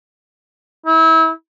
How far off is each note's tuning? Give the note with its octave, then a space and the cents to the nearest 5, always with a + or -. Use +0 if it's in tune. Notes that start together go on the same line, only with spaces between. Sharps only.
E4 -30